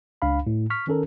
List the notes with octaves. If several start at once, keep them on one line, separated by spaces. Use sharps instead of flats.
C#2 D4 F5 B5
A2
C#6 F6 B6
D#3 C#4 A4 A#4